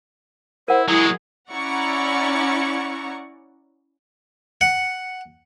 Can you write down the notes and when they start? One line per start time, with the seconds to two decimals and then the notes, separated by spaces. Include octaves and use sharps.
0.68 E4 A#4 C5 F#5
0.88 F#3 G#3 E4 G#4
1.50 C#4 E4 D5 F#5 A#5 C#6
4.61 F#5